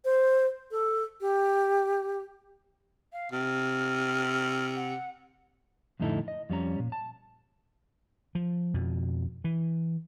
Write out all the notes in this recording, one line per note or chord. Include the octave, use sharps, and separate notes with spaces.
C5
A4
G4
F5
C3 F6
F#5
F2 A2 D3 D#4 E4 A4
D#5
F2 G3 C#4 A#5
A#2
A5
F3
F2 B2
E3